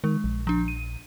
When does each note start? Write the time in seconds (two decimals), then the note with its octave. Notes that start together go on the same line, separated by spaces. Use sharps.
0.04 D#3 G#3
0.24 A#1
0.47 F3 D4
0.68 D#7